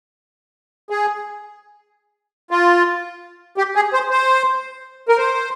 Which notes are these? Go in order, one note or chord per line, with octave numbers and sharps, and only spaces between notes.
G#4
F4
G4
G#4
C5
C5
A#4
C5